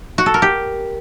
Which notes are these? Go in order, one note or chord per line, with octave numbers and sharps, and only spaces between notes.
F#4
A4
A#4
G4